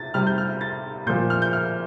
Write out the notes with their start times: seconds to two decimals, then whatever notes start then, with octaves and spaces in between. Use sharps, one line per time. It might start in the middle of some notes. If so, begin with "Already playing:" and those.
Already playing: C3 A6
0.14 C3 G3 F6
0.27 G6
0.38 F6
0.61 A6
1.07 A#2 F3 G6
1.30 F6
1.42 G6
1.53 F6